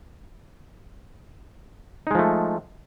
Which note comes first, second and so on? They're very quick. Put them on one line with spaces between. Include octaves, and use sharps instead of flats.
D#4 G#3 F3 A3